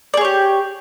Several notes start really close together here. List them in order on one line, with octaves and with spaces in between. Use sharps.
D5 G#4 C#5 G4